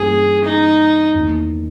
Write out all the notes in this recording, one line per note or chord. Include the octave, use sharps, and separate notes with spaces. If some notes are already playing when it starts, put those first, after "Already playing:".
Already playing: G2 E3 A#3 C#4 G#4
D#4
E2 D#3 A#3